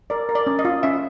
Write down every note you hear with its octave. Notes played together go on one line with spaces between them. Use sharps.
A#4 D5
A#4
D5
C#4
D#5
F4
C#4 E5